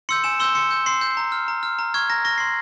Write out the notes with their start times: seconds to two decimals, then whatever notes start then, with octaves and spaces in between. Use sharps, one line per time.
0.09 C6 E6 G6 C#7
0.24 G#5 E7
0.40 C6 E6 G6 G7
0.55 C6 C#7
0.71 G6
0.86 C6 C7
1.01 G6
1.17 A#5
1.32 F6
1.48 A#5
1.63 F6
1.79 A#5
1.94 C#6 F6 G#6
2.10 A#5 A#6
2.25 C#6 F6 A#6
2.38 C6 C7